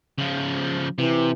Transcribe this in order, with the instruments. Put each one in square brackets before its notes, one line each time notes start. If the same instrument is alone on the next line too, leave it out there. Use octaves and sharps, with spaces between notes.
[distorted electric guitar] C#3 F3
[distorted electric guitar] C3 [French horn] E3